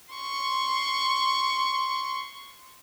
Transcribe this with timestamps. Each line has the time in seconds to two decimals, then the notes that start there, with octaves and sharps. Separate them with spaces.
0.15 C6 C#6